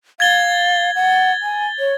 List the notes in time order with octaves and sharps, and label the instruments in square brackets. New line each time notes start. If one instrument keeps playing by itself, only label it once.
[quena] F5 [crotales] G#6 A6 G7
[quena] F#5
G#5
C#5